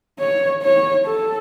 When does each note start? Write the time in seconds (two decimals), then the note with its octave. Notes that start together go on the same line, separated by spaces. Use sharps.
0.19 C#5
0.63 C#5
1.06 A4